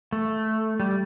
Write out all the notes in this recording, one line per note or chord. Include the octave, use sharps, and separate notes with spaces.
A3
G3